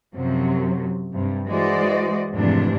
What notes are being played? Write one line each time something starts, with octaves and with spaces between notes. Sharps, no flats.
F#2 C3 F3 F#3
G2 C3
E3 G#3 F#4 C5 D5 D#5
F2 G#2 C3 E3 A3 D4